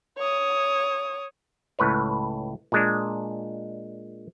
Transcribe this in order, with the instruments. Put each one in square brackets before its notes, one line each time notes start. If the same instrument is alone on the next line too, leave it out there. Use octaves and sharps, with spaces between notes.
[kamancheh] C#5 D#6
[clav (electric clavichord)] C#2 A2 B4 C#5
A#2 G#3 D4